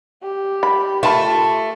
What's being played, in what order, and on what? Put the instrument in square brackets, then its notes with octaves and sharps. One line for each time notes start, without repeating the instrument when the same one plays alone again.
[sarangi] G4
[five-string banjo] B5
[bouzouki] A3 [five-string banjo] F4 A5 B5